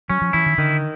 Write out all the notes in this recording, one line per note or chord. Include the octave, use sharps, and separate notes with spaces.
F#3 C#4
F3
E3 E4
D#3
D3 D#3